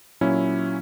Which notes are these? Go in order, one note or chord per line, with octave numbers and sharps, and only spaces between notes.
A#2 F#3 C#4 E4